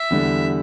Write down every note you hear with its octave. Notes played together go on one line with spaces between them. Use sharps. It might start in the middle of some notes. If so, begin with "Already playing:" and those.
Already playing: E5
E2 D3 G3